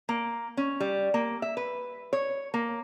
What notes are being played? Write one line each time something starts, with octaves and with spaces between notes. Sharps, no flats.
A#3
C#4
G3
A#3
E5
B4
C#5
A#3